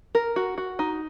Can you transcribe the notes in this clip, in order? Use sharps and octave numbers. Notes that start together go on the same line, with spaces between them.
A#4
F#4
F#4
D#4